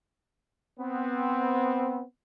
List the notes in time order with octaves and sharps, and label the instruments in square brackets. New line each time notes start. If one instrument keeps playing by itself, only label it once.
[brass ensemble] B3 C4